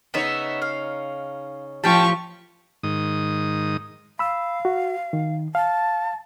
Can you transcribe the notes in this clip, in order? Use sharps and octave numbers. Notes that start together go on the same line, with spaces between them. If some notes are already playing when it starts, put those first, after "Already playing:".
C#3 B3 D#4 C#5 E5
F5
A2 F3 C#4 G4 G5 A5 C#6
G#2 D#3 D#6
F5 B5 E6
F#4
D#3
F5 A5